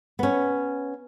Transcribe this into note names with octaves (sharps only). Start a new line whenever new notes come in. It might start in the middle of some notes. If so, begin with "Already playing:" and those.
B3 C#4